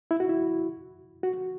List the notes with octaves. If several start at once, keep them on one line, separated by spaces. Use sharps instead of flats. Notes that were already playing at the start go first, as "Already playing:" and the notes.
E4
F#4
E4
F#4